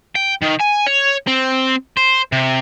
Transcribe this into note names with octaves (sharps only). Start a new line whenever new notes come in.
G5
D#3
G#5
C#5
C4
C5
C3